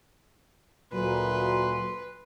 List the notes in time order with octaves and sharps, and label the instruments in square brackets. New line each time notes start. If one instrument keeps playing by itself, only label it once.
[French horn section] D2 A#2 [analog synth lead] F#3 [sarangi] B4 [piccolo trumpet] C6